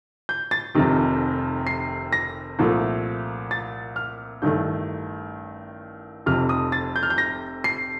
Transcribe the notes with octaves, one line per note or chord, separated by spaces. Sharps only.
G6
A6
F1 F2 C3 D#3
C7
A#6
C2 A#2 F3 A3
A6
F6
A1 G2 D#3 A3 G6
F1 F2 C3 F6
D#6
A6
G6
F6
G6
A#6
C7